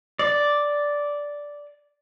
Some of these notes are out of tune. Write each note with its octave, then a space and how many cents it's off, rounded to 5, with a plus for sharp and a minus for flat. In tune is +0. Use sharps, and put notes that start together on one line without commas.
D5 -5